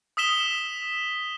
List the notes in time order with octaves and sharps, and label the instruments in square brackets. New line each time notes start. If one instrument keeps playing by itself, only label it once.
[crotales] D#6 E6 B6 E7 G7